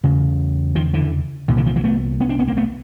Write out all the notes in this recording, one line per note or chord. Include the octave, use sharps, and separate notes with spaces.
E2 C#3
D#3 F3
D3 E3
C2 A#2 D#3
D3 E3
D#3 F3
E3 F#3
A3 B3
B3 C#4
C4 D4
B3 C#4
A#3 C4
A3 B3